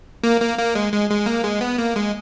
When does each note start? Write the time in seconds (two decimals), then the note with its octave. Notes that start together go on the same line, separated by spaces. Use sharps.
0.23 A#3
0.41 A#3
0.58 A#3
0.75 G#3
0.92 G#3
1.10 G#3
1.26 A#3
1.44 G#3
1.61 B3
1.78 A#3
1.96 G#3